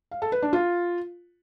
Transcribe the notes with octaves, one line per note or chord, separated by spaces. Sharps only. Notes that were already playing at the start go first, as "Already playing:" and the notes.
F5
A4
B4
D4
F4